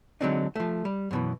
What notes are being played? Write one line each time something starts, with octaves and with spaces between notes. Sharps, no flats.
D3 F#3 G#3 C4 D4 D#4
F3 A3
G3
F#2 B2 E3